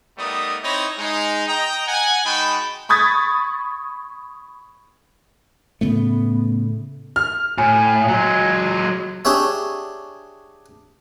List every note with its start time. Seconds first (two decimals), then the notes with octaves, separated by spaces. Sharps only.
0.18 G3 A3 B3 D#4 A#4 D#6
0.63 C4 D#4 E4 C#5 A#5 B5
0.98 G#3 D#4
1.47 D#5 G5 A#5
1.87 F#5 G#5
2.25 G#3 D#4 F#4 G5 A5 B5
2.89 B5 C#6 D#6 G#6 A6 B6
5.81 A2 C#3 A3 B3
7.16 F6
7.58 A2 G#5
8.08 F#3 G#3
9.25 D4 G4 G#4 C#5 E5